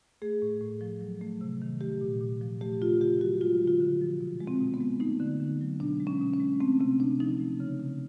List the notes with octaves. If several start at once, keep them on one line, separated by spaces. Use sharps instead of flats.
A3 G#4
A2
A2
F3
F#3
A3
C3
D#3
A3 G4
A#2
A#2
F3
A3 G4
C#3 F4
C#3 G4
F#3 F#4
G#3 F4
D3
F4
D3
F3
B2
G#3
C4
B2
B3
G#3
A3 D#4
D3
D3
F#3
B2 D4
G#3
C#4
B2
C#4
G#3
A3 C4
C3 C4
C3 D4
F3 D#4
A3
C#3
C#3